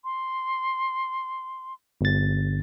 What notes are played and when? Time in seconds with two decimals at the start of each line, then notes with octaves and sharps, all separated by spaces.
0.04 C6
2.01 G1 A6